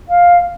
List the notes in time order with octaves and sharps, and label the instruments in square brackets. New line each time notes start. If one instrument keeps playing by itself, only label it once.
[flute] F5